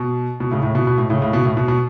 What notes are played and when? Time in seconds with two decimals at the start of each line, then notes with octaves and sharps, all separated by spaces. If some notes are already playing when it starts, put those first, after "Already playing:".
Already playing: B2
0.40 B2
0.51 A2 C#3
0.63 A2 C#3
0.75 B2
0.87 B2
0.98 A2
1.10 A2 C#3
1.22 A2 C#3
1.33 B2
1.45 A2
1.57 B2
1.68 B2